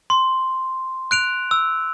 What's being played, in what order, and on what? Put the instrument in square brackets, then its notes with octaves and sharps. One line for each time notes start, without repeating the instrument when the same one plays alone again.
[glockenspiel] C6
F#6 D7 F7
E6